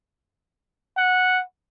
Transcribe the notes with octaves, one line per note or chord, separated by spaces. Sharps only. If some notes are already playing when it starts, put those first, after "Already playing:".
F#5